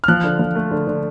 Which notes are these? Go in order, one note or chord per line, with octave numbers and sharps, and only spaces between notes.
F6
F3 F#6
D3
F3
A3
D3
D3